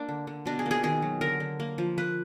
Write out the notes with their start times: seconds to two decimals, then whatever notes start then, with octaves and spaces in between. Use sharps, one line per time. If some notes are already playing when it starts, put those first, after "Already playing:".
Already playing: A#3 D4
0.09 D3
0.27 D3
0.46 B2 D4
0.59 G#4
0.66 A#3
0.71 G#4
0.83 D#3 G#4
1.02 F#3
1.21 D3 A#4
1.40 D3
1.60 A#3
1.78 F3
1.98 A#3 B4